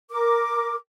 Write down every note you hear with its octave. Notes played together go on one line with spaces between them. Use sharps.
A#4 D6